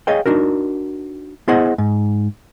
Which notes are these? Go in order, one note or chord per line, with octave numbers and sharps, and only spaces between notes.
G#4 C#5 D#5 F5 G5
D4 D#4 F#4 A#4
B3 E4 G#4 C5 D#5 F#5
G#2